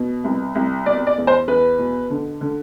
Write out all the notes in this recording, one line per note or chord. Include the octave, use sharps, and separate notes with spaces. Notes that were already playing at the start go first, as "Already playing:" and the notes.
Already playing: B2
C2
C2
B2 D5
D5
E2
C5
E2 B4
B2
D3
D3